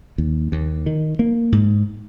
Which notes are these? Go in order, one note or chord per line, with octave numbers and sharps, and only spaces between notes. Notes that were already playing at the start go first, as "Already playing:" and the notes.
D#2
D#2
D#3
A#3
G#2